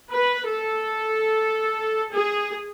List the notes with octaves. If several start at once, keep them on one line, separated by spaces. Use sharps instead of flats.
B4
A4
G#4